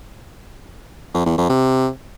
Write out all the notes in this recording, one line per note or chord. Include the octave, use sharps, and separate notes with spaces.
F2
E2
F2
C3